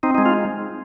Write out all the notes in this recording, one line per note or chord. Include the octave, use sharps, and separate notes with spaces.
C4 D#4
D#4
G#3
F4